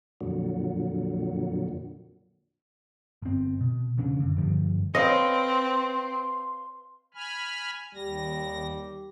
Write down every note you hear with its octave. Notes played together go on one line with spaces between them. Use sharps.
F2 A#2 D3 F#3
G1 C4
B2
E1 C#3 C#4 D4
F#2 D3
G2 D3 F3 G3
C4 B4 C#5 D#5 F5 C6
G#5 B5 F6
D#2 G3 A#6